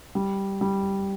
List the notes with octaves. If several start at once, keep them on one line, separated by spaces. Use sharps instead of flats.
G3
G3